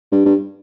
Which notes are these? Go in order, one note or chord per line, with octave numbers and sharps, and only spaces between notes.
G2
G2